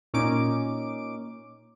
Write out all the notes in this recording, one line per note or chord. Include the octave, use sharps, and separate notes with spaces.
A#2 C#4 D#4 D6 D7